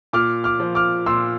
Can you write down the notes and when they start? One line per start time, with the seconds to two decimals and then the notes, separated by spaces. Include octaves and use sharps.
0.13 A#2 D6 F6
0.44 D6 F6
0.60 F3
0.75 D6 F6
1.06 A#2 C6 E6